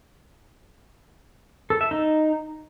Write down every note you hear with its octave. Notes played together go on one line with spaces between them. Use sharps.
A4
E5
D#4